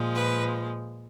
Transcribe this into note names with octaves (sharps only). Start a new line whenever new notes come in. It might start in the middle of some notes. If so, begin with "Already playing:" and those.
Already playing: A#2 F3 G#3
B4